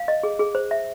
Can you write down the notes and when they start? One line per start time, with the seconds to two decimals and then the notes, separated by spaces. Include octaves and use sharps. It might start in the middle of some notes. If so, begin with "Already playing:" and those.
Already playing: F5
0.08 D#5
0.23 G#4
0.39 G#4
0.55 C5
0.71 E5